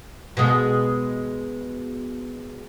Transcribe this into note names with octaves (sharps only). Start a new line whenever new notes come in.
B2 G#3